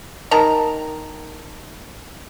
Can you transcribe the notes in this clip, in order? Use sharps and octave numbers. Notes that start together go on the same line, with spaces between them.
D#3 A5 A#5